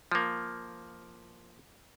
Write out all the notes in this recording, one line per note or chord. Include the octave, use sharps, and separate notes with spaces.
F3 A#3